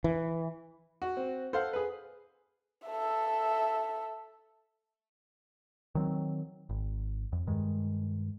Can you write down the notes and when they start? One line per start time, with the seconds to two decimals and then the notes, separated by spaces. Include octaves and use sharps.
0.04 E3
1.02 F#4
1.17 C4
1.53 A4 C5 F5 F#5
1.73 G#4 B4
2.87 A4 E5
5.95 D#3 F#3 C4
6.69 G#1
7.33 F2
7.47 G2 D#3 G#3